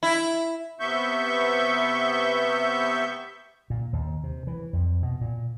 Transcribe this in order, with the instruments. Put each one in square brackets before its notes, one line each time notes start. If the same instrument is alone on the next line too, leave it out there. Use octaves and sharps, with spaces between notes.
[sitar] E4
[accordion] C3 B3 E5 C#6 G6
[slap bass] A#2
D#2
C3
E3
F2
B2
A#2